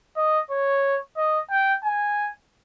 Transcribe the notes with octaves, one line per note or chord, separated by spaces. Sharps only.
D#5
C#5
D#5
G5
G#5